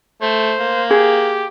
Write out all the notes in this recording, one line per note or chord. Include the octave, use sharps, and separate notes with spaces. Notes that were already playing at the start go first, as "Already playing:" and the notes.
A3 C5
A#3
G4 G#4